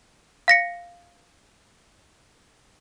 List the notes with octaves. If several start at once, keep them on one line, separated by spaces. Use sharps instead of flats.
F5 A#6 C#7